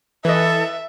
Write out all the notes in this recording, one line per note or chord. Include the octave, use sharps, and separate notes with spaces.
E3 A4 B4 D#5 E5